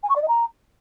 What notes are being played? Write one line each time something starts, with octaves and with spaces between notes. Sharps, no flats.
G#5
C#6
D5
D#5
A#5